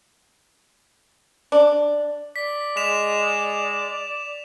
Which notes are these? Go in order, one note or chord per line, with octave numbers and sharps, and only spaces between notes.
D4
D5 B6
G#3 B6 E7 F7